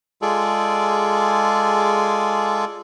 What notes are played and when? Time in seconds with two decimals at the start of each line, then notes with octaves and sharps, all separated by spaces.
0.22 G#3 F4 G#4 A4 D5